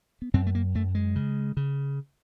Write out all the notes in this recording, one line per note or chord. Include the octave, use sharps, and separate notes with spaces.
B3
F#2 C4
A3
A#3
F#2 A3
G#3
C#3
C#3